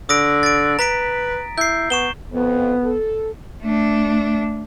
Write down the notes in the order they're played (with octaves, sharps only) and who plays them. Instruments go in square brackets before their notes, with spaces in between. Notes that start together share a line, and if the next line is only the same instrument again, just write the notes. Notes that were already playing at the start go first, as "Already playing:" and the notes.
[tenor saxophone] D3 [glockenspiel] D#6 A#6 D7
[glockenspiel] A6 D7
[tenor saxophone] B4 [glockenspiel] A#5 B6 D7
[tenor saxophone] E4 [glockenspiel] G6 C7
[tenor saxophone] B3 [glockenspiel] C#6 E7 G7
[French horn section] F2 [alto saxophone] B3
[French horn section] A4
[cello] A3 D4